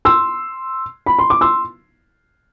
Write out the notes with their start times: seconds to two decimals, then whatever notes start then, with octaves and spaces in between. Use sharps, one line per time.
0.05 C6 E6
1.06 B5
1.19 C6
1.30 D6
1.41 C6 E6